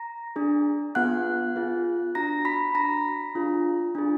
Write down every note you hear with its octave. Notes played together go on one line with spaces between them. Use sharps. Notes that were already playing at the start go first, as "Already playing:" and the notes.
Already playing: A#5 A#6
D4 G#4
B3 F4 G#4 F#5 F#6
B3 F4 G#4
D4 F#4 A#5 A#6
B5 B6
D4 F#4 A#5 A#6
D4 F4 G#4
D4 F4 G#4